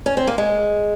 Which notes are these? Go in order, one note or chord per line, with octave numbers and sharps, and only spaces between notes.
C#4
C4
A#3
G#3